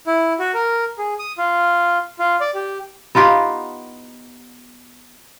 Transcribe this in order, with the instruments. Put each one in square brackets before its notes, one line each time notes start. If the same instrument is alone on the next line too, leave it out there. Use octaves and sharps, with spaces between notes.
[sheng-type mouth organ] E4
F#4
A#4
G#4
D#6
F4
F4
D5
G4
[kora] B3 D#4 F4 G4